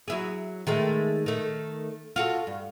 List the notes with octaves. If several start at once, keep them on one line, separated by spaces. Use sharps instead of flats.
F#3 E4 G#4
D#3 G#3 A3
D#3 A3
F4 F#4 A4
G2